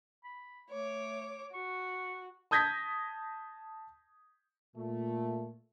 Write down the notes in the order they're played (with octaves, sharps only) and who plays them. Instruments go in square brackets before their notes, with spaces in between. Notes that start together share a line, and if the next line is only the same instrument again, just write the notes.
[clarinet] B5
[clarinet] A3 [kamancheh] C#5 D6
[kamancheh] F#4 [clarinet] C#6
[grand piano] A5 D#6 G6 G#6 A#6 B6
[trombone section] A#2 [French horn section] A3